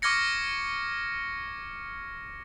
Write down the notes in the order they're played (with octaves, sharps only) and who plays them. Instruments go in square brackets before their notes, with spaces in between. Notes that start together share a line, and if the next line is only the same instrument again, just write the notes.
[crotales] C#6 D6 F6 G#6 A#6 C#7